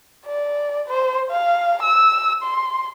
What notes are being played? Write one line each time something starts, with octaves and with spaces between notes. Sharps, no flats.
D5
C5
F5
E6
C6